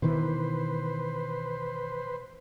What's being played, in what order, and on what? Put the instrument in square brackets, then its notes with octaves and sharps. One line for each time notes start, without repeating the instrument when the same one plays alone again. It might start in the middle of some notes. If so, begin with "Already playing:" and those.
[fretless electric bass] B2 D#3 E3 [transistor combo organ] B4 C5